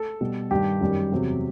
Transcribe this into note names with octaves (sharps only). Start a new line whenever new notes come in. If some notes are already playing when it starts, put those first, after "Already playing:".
Already playing: A4
B2 G3
G2 D#3 G3 G4
F#2 D#3 G3
E2 C3 F#3